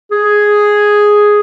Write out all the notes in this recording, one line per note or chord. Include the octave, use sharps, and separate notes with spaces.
G#4